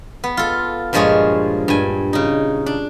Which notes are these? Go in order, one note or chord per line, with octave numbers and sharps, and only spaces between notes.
B3
F4 A4
G2 A#2 F3 G#3 G#4 C#5
G2 G#5
C#3 D#4
D4